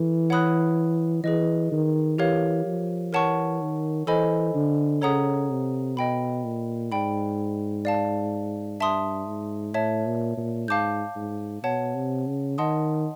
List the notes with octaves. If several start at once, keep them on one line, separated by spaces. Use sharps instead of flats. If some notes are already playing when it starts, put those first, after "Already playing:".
Already playing: E3 A4
C#5 F#5 B5 D#6 F#6
E3 G#4 B4 D#5
D#3
E3 G4 A#4 C#5 F5
F3
E3 A#4 C#5 F#5 A5 C#6
D#3
E3 A4 C5 D#5 G#5 B5
D3
C#3 A4 C#5 F#5 A#5 D#6
C3
B2 D#5 G5 B5
A#2
G#2 D5 G5 B5
D5 F5 A5
G2 E5 A5 C6 D#6
G#2
A2 C#5 E5 A5
A#2
A#2
G#2 F5 A5 D6 G6
G#2
B2 C#5 F#5 A5
C3
C#3
D#3 D#5 F#5 A5 C6 D#6